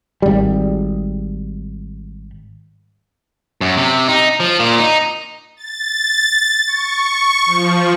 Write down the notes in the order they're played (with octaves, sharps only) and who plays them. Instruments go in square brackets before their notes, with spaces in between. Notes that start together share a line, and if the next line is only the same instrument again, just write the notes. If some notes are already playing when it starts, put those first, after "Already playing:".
[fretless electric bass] G#1 G3
[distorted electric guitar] F#2
C3
D#4
F3
A#2
D#4
[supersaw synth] A6
C#6
F3